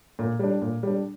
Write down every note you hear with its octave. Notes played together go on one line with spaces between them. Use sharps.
A#2
G3 D4
A#2
G3 D4